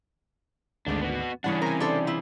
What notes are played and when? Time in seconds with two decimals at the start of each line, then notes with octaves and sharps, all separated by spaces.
0.87 G#1 D2 G#3 D4 D5
1.01 B3 F#4
1.44 C#3 E3 G3 C#4 D4 F#5
1.62 C3 C#4 A#4 G#5
1.80 D4 A4 C5
2.07 E4 F4